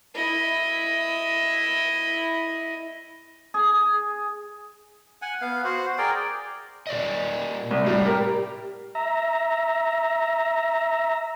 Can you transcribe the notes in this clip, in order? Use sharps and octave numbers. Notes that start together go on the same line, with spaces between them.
E4 D#5
G#4
F#5 G#5
B3 F5
F#4 C5
G#4 A#4 D5 G5
A#2 D5 D#5
C2
A2 G3
G4 A#4
E5 A#5